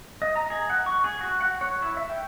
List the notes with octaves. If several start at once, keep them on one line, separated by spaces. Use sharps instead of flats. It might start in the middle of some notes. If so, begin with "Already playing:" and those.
D#5
A#5
G#4
F#5
C#6
G#4
F#4
F#5
C#5
E4
E5
G5